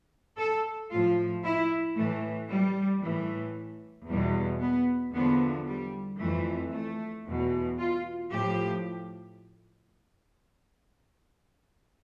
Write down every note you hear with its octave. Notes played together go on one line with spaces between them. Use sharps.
A4
A2 F3 F4
E4
A2 E3 A3
G3
A2 E3
E2 B2 G3
B3
E2 D3 F3 B3
G3
F2 E3 A3
A3
E2 B2
F4
A2 F3 G4